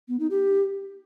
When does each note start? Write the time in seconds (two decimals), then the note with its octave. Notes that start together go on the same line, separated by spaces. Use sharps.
0.08 B3
0.19 D#4
0.30 G4